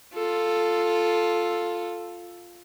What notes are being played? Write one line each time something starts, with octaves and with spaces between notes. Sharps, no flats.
F4 A4